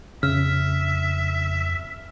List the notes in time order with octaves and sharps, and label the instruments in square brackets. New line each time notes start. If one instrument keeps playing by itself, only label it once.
[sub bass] F2 [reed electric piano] C#3 [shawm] E5 [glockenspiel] F6